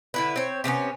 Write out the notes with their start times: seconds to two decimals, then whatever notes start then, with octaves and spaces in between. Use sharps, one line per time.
0.14 D3 E4 B4
0.36 C4 C#5
0.64 C3 A3 B3 C#4